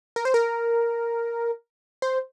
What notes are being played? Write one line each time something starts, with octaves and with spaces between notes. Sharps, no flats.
A#4
C5
A#4
C5